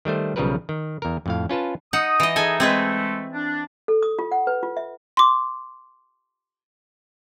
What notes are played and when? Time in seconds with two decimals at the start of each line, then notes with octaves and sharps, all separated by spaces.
0.05 D#3 G3 A3 C5
0.36 B1 C#3 F3 G3 A#4 B4
0.69 D#3
1.02 E2 A#4
1.26 F2 A2 F5
1.49 C#4 F4 B4 A5
1.93 D#4 F#5 D#6
2.20 E3 D#5
2.36 D#4 G#4 A4 D#5 G#5
2.60 G#3 A3 C4 G#4 B4
3.33 D4
3.88 A4
4.02 D#6
4.19 F4
4.31 F#5
4.47 B4
4.63 F4
4.77 E5
5.17 C6 D6